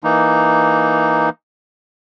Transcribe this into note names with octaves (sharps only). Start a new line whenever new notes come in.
E3 A#3 D#4